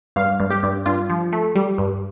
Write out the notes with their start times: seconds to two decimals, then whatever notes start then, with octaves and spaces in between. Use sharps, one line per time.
0.16 G2 F5
0.40 G2
0.50 G4
0.63 G2
0.86 G2 F4
1.10 F3
1.33 A3
1.55 G3
1.78 G2